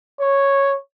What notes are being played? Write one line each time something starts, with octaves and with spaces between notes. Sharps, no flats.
C#5